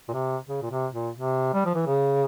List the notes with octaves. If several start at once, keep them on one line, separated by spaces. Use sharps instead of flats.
A#2
C3
C#3
A#2
C3
A#2
C3
G3
F3
E3
C#3